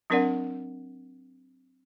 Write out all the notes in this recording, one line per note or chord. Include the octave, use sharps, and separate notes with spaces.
F#3 C4 D4 A#4 D5 F#5